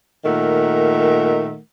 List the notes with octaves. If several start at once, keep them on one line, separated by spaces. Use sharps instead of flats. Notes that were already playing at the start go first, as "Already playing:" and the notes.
A#2 D#3 A3 A#4 F#5